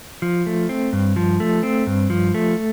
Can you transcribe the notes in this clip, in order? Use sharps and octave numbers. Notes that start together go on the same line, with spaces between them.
F3
A3
C4
G2
F3
A3
C4
G2
F3
A3